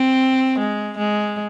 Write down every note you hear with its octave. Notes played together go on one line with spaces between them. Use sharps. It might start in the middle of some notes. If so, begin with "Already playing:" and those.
Already playing: C4
G#3
G#3